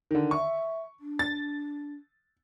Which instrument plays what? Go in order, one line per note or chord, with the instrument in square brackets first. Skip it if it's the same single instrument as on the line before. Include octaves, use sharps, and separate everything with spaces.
[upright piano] D3 D#3
[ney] E5 [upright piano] C#6
[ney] D4
[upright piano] A6